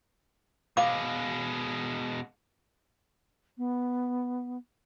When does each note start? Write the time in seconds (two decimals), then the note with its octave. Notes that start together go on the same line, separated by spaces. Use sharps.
0.77 B2 G#3 C5 F5 D6
3.58 B3